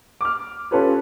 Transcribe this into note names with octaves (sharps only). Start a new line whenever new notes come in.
D6 F6
C#4 F4 G4 A4 B4 C#5